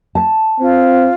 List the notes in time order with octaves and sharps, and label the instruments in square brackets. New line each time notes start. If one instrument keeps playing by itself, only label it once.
[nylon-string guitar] A5
[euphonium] C4 [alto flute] F4